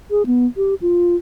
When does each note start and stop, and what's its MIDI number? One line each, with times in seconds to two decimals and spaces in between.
0.11 0.26 68
0.26 0.46 59
0.57 0.75 67
0.82 1.16 65